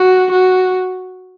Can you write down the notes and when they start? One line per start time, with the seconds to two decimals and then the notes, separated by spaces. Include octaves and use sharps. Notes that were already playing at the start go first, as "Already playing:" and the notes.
Already playing: F#4
0.32 F#4